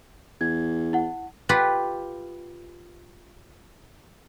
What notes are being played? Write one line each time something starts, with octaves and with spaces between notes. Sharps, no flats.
E2 G#6
E4 F#5
F4 G4 B4 F#5